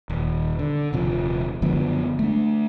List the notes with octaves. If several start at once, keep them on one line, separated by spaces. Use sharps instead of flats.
D#1
D3
D#1 C3 F3
F#1 D3 F3 B3
A3 D4